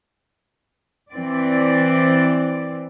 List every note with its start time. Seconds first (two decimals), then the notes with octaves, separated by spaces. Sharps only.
1.12 E3 C4 D5